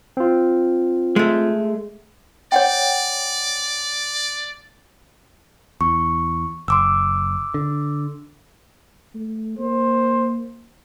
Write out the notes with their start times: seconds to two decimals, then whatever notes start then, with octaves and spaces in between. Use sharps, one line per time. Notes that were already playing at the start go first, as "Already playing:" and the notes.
0.17 C4 F4
1.16 G#3 A3
2.52 C#5 D5 F#5 G5
5.81 E2 C#6
6.68 F#1 C6 D6 E6
7.54 D3
9.14 A3
9.59 A#3 C5